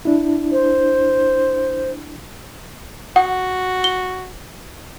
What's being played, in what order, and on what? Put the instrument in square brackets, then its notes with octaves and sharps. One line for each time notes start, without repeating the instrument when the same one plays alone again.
[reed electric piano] D4 E4
[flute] C5
[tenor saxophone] F#4 [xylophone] F#5
[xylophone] G7